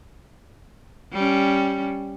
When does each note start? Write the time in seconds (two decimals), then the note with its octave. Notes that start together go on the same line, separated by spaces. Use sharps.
1.13 G3 C#4